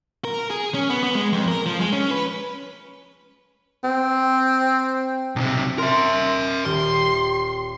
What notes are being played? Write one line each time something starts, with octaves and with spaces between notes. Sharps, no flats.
A#4
G#4
C#4
B3
B3
G#3
F2
A#4
F3
G#3
C#4
B4
C4
B1 C3
A#4 E5 C6
D#1 G4 C6